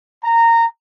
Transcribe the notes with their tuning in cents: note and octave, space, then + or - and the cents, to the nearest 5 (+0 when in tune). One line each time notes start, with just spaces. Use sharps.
A#5 -15